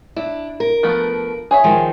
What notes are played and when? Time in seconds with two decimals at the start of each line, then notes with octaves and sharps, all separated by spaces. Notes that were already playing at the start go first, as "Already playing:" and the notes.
0.16 D4 E4
0.60 A#4
0.83 F3 A3 B3
1.51 G#4 C#5 E5
1.64 D#3 F3 G#3